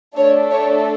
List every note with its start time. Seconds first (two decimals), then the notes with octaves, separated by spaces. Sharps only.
0.17 A3 D4 A4 C#5
0.52 C#5